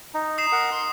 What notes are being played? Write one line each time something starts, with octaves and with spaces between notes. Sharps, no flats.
D#4
D#6 C7 E7
A#4 F#5
C6